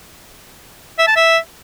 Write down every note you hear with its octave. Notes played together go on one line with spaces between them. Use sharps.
E5
A5
E5